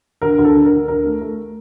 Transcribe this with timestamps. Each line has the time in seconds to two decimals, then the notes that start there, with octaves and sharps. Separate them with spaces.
0.22 D2 A#4
0.38 D2
0.44 A4
0.55 D3
0.66 A#4
0.71 D2
0.88 D2 A#4
1.04 A3
1.21 A3 A#4